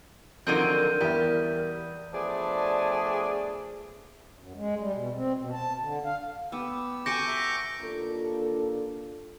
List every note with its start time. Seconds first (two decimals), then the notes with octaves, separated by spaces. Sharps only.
0.47 D3 D#3 F3 F#3 C4 A#4 G6 D#7
1.01 E2 G3 E5
2.13 F3 A3 B3 D4 G#4 D5
4.39 F#2
4.56 G#3
4.79 G3
4.94 B2
5.15 C4
5.37 B2
5.52 A5
5.81 D3
6.05 F5
6.52 B3 G4 E6
7.06 F#4 A4 G#5 C#6 D6 G6 A#6 C#7
7.28 E5 A#5
7.81 D#2 A#3 D4 F4 A4